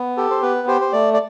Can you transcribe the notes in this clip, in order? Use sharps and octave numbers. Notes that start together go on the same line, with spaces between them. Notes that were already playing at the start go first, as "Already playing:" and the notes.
Already playing: B3
G4 A4
C5
B3 B4
G4 C5
C5
A3 D5
D5